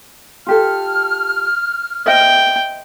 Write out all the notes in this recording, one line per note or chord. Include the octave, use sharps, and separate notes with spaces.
F4 G4 A4 F6
C5 D#5 E5 G5